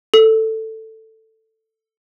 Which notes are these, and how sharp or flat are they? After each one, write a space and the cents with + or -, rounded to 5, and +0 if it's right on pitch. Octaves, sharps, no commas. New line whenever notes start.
A4 +10